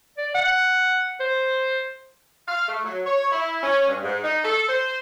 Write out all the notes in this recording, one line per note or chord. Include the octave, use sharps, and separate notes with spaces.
D5
F#5
C5
F5
A3
F#3
C#5
E4
C#4
G2
G#2
D#4
A4
C5